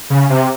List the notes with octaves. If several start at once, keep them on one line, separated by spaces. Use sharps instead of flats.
C#3
C3